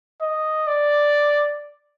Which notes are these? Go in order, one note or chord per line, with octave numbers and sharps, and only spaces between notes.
D#5
D5